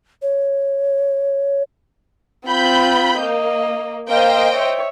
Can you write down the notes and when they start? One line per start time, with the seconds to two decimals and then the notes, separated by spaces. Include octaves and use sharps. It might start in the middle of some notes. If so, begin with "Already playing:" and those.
0.22 C#5
2.48 C4 F4 B5 G6
3.19 A#3 D#5
4.09 A#3 C5 D#5 F5 G5
4.52 C#5 E5